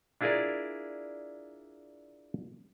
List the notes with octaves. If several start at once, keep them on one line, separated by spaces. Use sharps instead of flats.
D4 E4 F4 G#4 A#4 D5